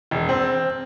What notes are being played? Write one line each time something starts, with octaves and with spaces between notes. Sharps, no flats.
E1
C4